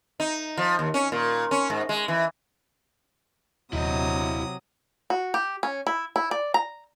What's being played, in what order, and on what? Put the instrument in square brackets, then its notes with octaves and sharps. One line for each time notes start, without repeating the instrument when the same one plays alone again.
[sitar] D#4
F3
D#2
C#4
A#2
C#4
G#2
G#3
E3
[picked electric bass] D#1 [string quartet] C3 F#3 D#6 [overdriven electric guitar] E4 D#5
[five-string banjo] F#4
G4
C#4
E4
E4
D5
A#5